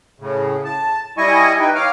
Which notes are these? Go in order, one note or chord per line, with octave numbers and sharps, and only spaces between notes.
A2 C#3
A5
G3 E4 D#5 G#5 C#6
D#4 B4 G5
C#5 F5 D6 F6